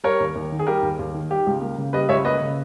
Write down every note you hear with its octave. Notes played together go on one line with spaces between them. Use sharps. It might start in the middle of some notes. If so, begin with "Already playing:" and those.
G3 A#4 C#5
D#2
D#2
D#3
G#4
G3 G4 A#4
D#2
D#2
D#3
G3 G4
C#2
A#3
C#3
G3 B4 D#5
C#2 C#5 E5
A#3 B4 D#5
C#3